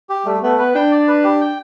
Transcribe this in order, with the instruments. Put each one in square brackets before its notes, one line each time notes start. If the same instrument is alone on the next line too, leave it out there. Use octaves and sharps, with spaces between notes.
[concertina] G4
[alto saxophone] G3 [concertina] A3
[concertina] A3 [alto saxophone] B3
[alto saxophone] B3 [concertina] B4
[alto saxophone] D4 [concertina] G5
[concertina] D5
B4
G4
G5